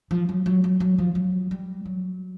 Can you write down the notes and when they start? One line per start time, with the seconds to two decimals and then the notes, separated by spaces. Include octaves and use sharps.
0.11 F3
0.29 F#3
0.46 F#3
0.64 F#3
0.80 F#3
0.98 F3
1.15 F#3
1.51 G3
1.86 F#3